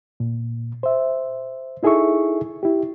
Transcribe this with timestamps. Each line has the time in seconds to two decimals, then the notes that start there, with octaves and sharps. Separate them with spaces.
0.20 A#2
0.83 C5 E5
1.83 D#4 E4 G#4 A4 E5 C#6
2.63 E4 G4